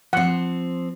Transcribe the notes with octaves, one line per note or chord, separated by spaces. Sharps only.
F3 C4 F#5